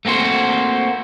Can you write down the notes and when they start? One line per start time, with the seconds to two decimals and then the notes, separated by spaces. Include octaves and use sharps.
0.05 A3 A#3 C4 F#4 C5